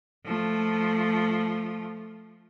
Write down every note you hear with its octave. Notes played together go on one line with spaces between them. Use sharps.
F3 A3